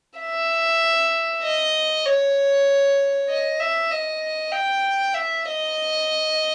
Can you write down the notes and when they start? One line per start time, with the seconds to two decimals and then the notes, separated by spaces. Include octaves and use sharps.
0.19 E5
1.44 D#5
2.06 C#5
3.29 D#5
3.60 E5
3.91 D#5
4.52 G5
5.14 E5
5.45 D#5